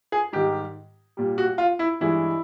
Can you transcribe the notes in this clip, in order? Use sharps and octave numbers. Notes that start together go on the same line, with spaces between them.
G#4
G#2 D#3 G3 G4
A#2 G3
F#4
F4
E4
G2 E3 G#3 E4